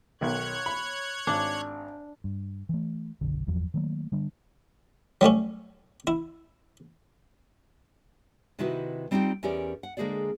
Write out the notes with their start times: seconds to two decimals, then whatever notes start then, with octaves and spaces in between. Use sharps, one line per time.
0.21 B1 D#3 C#5 F#6 G#6
0.66 B5
1.27 G#1 D4
2.24 G2
2.69 E3 A3
3.21 F#1 B1 D3
3.47 G1 E2 F3 F#3
3.74 D#3 F#3 A3 A#3
4.12 D3 G3 D4
5.21 F#3 G3 A3 C#4
6.07 E4
8.59 C3 D#3 D#4 E4 F#4 B4
9.11 G3 C4 D#4 F4 G4 G5
9.43 E2 C#4 G4 A#4 D5
9.83 F#5
9.97 D3 G#3 A#3 G#4 C5 D5